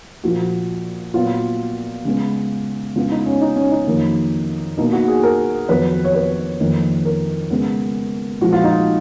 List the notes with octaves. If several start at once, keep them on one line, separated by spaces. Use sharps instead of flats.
A#2 F3 A#3 F#4
A#2 F#3 B3 F4
C#3 G#3 B3
C#3 G#3 B3 F4
D#4
C#4
D#4
C#4
D#4
F2 D#3 F#3 A#3
B2 A#3 D#4
F#4
G#4
A#4
F2 D#3 F#3 B3 B4
C#5
B4
F2 D#3 A#3
A#4
C#3 G#3 B3
A#2 F3 G#3 F#4
F4
D#4